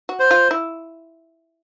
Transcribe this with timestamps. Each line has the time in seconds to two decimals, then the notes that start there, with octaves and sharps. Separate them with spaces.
0.09 F#4
0.20 C5
0.31 F4
0.51 E4